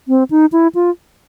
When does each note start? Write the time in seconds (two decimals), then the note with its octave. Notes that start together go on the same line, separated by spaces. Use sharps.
0.08 C4
0.31 D#4
0.52 E4
0.75 F4